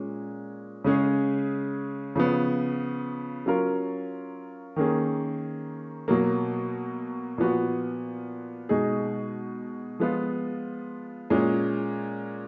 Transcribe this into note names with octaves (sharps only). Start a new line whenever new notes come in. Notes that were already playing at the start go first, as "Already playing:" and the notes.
Already playing: A#2 G#3 C#4
C#3 G#3 C#4 G#4
C#3 F3 B3
F#3 C#4 F4 A#4
D#3 A#3 C#4 G#4
B2 F#3 A#3
A#2 F3 B3 F#4
B2 G#3 D#4 G#4
F3 G#3 B3 F4
A#2 G#3 C#4